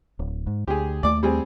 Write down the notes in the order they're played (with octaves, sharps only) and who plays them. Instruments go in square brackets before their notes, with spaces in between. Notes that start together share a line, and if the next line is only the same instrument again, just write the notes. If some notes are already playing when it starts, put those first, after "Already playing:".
[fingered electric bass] D1
G#2
[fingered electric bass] D2 [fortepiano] G4 G#4
[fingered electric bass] D#2 A3 [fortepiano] D5 D6
[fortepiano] G3 C4 G#4